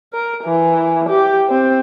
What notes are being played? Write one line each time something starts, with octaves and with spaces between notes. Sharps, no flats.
A#4
E3
G4
C4